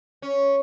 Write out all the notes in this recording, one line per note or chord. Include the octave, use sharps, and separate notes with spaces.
C#4